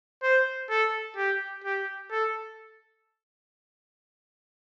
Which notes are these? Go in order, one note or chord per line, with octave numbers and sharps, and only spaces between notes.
C5
A4
G4
G4
A4